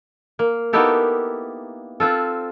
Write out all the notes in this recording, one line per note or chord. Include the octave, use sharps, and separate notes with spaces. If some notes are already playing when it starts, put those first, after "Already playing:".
A#3
A#3 B3 D#4 E4 G4 A4
C4 F4 A4